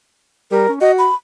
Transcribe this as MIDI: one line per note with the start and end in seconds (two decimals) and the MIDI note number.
0.51 0.65 55
0.51 0.70 70
0.68 0.78 61
0.81 1.07 66
0.81 0.92 75
0.99 1.14 83